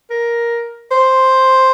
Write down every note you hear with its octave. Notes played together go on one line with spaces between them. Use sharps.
A#4
C5